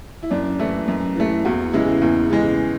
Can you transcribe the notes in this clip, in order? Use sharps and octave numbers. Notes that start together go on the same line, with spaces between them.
E4
F#2 D4
E3 A3 E4
F#2
E3 A3
E2 F#4
C#3 E3 G#3 E4
E2
C#3 E3 G#3